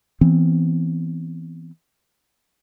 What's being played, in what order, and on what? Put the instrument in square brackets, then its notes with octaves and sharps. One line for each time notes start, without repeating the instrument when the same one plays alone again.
[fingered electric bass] E3 B3 C4